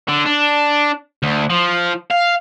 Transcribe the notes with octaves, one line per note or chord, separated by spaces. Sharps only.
D3
D4
D2
F3
F5